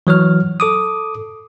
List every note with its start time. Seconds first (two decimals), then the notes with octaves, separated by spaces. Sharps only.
0.07 E3 F#3 C#5 F6
0.60 A4 D6 D#6